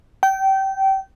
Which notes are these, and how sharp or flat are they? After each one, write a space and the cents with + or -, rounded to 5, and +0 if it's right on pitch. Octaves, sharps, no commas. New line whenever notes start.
G5 -25